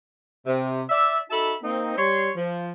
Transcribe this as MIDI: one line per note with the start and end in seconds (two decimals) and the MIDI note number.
0.46 0.82 48
0.89 1.18 74
0.89 1.18 76
1.30 1.54 63
1.30 1.54 66
1.30 1.54 69
1.30 1.54 76
1.30 1.54 81
1.30 1.54 83
1.63 1.96 58
1.63 1.96 60
1.63 1.96 63
1.97 2.30 55
1.97 2.30 73
1.97 2.30 84
2.36 2.71 53